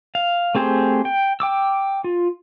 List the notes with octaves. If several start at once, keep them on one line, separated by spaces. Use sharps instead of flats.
F5
A3 C4 G4 G#4 C5
G5
G5 D6 E6
F4